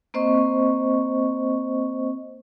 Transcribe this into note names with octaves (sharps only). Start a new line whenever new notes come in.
A#3 C4 C5 D#5 C#6